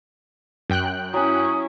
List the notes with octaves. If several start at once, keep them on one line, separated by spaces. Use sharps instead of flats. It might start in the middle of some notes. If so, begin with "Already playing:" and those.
F#2 G5 F#6
F#3 C#4 E4 G#5 D#6